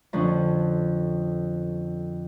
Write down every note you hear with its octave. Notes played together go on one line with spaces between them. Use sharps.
F2 D3 F3 C#4